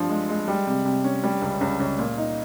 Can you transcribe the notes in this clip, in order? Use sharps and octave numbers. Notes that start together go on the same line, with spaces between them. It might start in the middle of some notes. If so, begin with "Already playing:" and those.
Already playing: G2 F3
G#3
G#3
G3
C3
C3
C#4
G3
C#2
C#2
C#2
A#2
D#4